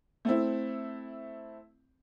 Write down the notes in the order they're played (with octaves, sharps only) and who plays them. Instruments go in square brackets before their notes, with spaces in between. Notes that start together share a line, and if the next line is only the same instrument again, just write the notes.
[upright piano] A3 C4 E4